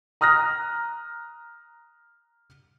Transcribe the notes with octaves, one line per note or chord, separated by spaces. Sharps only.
A#5 D#6 F6 F#6 A#6